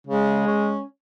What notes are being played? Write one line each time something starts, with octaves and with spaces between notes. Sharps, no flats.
C#3 G#3
C#4